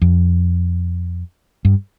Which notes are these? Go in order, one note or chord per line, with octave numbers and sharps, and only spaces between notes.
F2
G2